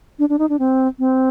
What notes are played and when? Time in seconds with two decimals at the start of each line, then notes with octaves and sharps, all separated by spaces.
0.19 D4
0.29 D4
0.39 D#4
0.49 D4
0.59 C4
0.99 C4